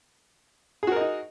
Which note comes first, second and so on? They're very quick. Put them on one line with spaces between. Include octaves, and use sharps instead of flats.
G#4 F#4 A#4 D#5 D#4